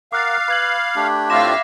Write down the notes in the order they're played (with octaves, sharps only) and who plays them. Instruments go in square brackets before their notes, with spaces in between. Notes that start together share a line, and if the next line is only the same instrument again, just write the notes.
[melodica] A#4 F#5 [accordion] F5 [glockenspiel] D6 F#6 A6
[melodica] B4 [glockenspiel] B5 G#6 F#7
[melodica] A3 D4 G4
[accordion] A2 C4 F4 [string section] E5 F5 [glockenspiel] D6 A#6 E7